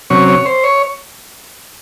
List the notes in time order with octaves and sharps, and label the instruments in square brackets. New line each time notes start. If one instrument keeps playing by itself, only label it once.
[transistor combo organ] C3 F#3 C#4 C#5
C#5
C5
C#5